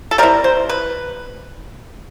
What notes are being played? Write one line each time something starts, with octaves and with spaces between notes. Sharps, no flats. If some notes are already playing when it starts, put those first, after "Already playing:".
A4
G3 C4 E4 A#4
C5
B4